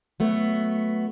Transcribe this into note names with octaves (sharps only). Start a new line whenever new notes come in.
F#3 A3 B3